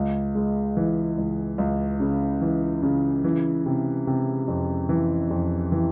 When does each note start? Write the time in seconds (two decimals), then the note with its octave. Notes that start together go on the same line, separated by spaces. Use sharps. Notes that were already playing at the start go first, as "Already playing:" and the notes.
Already playing: C#2
0.35 G#3
0.77 E3
1.18 C#2
1.58 C#2
2.00 C#3
2.42 E3
2.83 C#3
3.24 E3
3.66 C3
4.07 C3
4.48 F2
4.89 E3
5.31 F2
5.72 E3